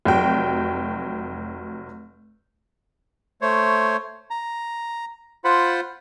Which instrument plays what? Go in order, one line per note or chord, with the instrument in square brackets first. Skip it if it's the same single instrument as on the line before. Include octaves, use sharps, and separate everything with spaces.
[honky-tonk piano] F1 F#3 G5
[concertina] A3 C5 C#5
A#5
F4 C5 F#5 B5